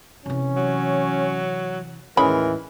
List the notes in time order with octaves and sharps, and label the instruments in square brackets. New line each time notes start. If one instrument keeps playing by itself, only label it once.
[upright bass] C3 E3 [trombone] C#4
[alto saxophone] F#3
[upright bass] D#2 A2 [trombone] E3 [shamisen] G#3 C#4 B5 [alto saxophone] A#4